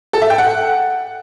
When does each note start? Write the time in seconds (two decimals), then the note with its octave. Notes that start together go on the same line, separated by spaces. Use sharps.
0.13 A4
0.22 E5
0.30 G5
0.38 F#5